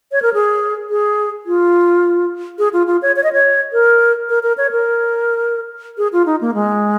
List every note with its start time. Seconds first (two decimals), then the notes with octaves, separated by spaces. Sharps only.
0.12 C#5
0.22 A#4
0.34 G#4
0.90 G#4
1.46 F4
2.59 G#4
2.73 F4
2.87 F4
3.02 C#5
3.16 C#5
3.24 D#5
3.33 C#5
3.73 A#4
4.29 A#4
4.43 A#4
4.58 C#5
4.71 A#4
5.98 G#4
6.13 F4
6.26 D#4
6.41 A#3
6.54 G#3